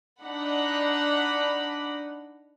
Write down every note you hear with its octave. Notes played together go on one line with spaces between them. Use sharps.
D4 D#4 F#5 B5